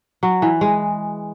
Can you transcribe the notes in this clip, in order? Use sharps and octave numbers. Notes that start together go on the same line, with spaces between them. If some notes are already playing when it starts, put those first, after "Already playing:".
F#3
E3
G#3